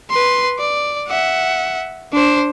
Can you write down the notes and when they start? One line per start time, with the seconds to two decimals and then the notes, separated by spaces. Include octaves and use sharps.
0.10 B4 C6
0.59 D5
1.08 E5 F#5
2.13 D4 C5